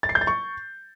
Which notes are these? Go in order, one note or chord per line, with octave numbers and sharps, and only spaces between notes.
A6
C7
G6
A6
C#6